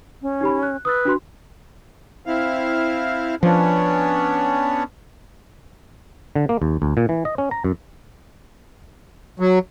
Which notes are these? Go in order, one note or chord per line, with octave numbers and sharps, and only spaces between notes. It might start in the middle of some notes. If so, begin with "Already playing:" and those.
C#4
D#4 G4 B5
F#6
B4 D#6 E6 A6
D4 F#4 C6
C4 E4 F5
F3 B3 C#4 D4
D3
A#3
D#2
D2
A#2
E3
D#5
C#4
A#5
F#2
F#3